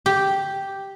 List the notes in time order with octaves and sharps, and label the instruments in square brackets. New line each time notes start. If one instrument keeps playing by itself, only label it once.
[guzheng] G4